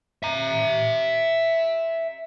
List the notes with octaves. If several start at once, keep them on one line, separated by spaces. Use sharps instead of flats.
E5 A#5